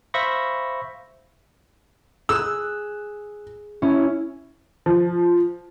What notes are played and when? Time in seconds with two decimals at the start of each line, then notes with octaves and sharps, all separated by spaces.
0.14 C5 E5 F5 B5 C#6 A#6
2.29 G#4 E6 F#6
3.82 C#4 E4
4.86 F3